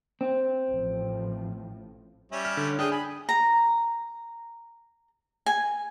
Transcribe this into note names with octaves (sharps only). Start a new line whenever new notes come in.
C4
A1 A2 F3
G3 C#4 E5
F6
D3
D4 G#4 G5 D#6
G#5 B5
A#5
G#5